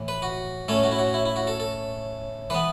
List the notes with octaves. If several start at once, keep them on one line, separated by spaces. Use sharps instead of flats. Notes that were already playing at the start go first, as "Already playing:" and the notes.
Already playing: A2 E3
B4
F#4
A2 A3 C#4 A4
F#4
E4
F#4
E4
E4
F#4
A4
A4
E3 B3 B4